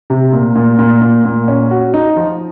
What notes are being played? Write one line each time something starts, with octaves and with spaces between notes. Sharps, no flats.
C3
A#2
A#2
A#2
A#2
A#2
C#4
F#4
D#4
F3